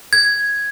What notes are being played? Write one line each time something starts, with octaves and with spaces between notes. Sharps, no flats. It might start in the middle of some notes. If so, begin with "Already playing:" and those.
G#6